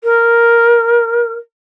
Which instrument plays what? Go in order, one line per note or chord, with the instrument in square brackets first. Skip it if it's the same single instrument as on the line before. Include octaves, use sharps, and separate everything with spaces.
[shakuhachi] A#4